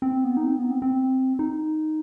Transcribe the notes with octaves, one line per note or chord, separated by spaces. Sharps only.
C4
B3
D#4
C4
B3
C4
C4
D#4